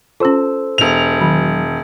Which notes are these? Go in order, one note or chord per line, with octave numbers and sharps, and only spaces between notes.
C#4 F4 A4 C5 E6
E1 F7
D#3 F#3